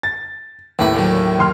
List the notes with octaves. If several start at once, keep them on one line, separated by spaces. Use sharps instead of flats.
A6
D#2 A2 D4 E4 B4
A#2 D3 F#3
D#2 C6 F6